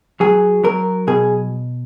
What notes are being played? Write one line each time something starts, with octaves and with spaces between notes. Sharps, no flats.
F#3 G#4
F#3 A#4
B2 G#4